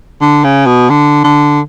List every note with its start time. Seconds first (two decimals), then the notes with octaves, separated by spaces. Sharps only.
0.21 D3
0.44 C#3
0.66 B2
0.90 D3
1.24 D3